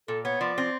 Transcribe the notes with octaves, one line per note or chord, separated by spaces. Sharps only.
A#2 A4
B3 C#5
F3 D5
C4